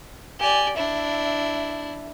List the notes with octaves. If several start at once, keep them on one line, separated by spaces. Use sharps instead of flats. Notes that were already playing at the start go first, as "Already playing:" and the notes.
G4 D5 G#5
D4 E4 E5